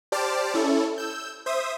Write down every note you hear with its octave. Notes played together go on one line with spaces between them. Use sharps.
G4 C5 D5 A5 D6 F6
C#4 E4 A4
E6 G6
C5 E5 D#6